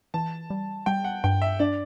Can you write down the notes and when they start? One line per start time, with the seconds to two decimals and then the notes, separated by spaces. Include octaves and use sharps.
0.14 E3 A5
0.50 G3
0.86 G3 G5
1.04 F#5
1.24 G2 G5
1.42 E5
1.59 D4 D5